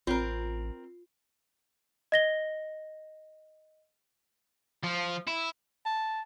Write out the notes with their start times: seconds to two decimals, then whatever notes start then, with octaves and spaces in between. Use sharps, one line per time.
0.07 A1 C4 F4 A#4
2.12 D#5 A#6 G7
4.83 F3
5.27 E4
5.86 A5